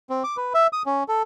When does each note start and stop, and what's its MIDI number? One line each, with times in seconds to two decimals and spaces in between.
0.10 0.23 60
0.24 0.37 86
0.37 0.53 71
0.54 0.67 76
0.73 0.83 87
0.86 1.03 61
1.08 1.22 69